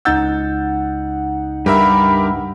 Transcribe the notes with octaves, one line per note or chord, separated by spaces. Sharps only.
C#2 D#4 F#5 E6 G6 A6
G2 G4 A#4 E5 B5